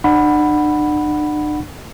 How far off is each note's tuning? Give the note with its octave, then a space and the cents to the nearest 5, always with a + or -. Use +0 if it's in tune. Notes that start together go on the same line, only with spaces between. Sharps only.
D4 +40 F#5 +0 B5 +0